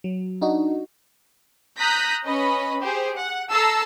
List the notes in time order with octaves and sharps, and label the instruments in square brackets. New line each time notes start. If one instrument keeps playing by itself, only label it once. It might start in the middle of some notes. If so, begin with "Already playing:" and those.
[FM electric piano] F#3
D4 D#4 F#4
[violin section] A#5 D#6 F#6 G6 A#6 B6
C#4 B4 D#5 B5
G4 G#4 C5
F#5
A4 A5 A#5 E6 C7